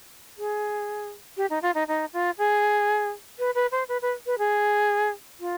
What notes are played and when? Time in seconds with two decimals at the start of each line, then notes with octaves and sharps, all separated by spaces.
0.38 G#4
1.37 G4
1.50 D#4
1.62 F4
1.75 D#4
1.88 D#4
2.13 F4
2.38 G#4
3.39 B4
3.55 B4
3.72 C5
3.89 B4
4.02 B4
4.26 B4
4.39 G#4
5.40 F4